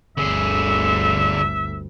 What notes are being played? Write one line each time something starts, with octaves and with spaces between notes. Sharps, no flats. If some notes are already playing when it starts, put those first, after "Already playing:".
G1 D2 D3 G#4 E5